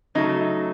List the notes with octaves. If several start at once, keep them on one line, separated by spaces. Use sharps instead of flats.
C#3 F#3 A3 D#4